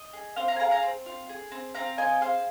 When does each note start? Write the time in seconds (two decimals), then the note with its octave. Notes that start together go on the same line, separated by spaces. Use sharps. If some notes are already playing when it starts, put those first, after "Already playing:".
Already playing: D#5
0.13 G#4
0.36 C4 C5 F5
0.48 F5 A#5
0.56 G#5
0.60 G#4 F5 A#5
0.71 F5 A#5
0.83 C4
1.06 F4
1.29 G#4
1.52 C4
1.75 C4 F5 A#5
1.98 F4 D#5 G#5
2.21 G#4 C5 F5